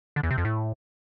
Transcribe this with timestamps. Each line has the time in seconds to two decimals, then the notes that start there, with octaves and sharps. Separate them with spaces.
0.16 D3
0.23 E2
0.30 C3
0.38 F2
0.45 A2